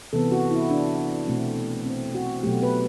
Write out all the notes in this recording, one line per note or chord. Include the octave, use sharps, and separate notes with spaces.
C3 E3 B3 A4
F#4
E4
D4
B2 A3 C4
C4
F#4
B2 F#3 A3 G4
B4